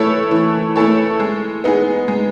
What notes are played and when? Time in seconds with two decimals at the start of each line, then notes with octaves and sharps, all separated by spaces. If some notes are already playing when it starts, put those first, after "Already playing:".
Already playing: E3 A3 E4 A4 C#5
0.31 E3
0.76 A3 E4 A4 C#5
1.20 G#3
1.64 B3 D#4 G#4
2.08 G#3